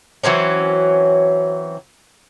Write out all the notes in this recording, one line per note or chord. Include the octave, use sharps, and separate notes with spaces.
E3 F#3 C4 C#4